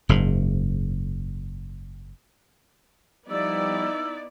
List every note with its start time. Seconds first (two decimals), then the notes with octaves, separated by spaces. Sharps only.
0.09 F#1 G#2
3.30 F3 G3 B3 D#4 E4 D5 E6